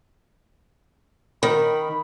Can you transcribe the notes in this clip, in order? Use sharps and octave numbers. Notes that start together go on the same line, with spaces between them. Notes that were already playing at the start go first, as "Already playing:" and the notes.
D#3 B5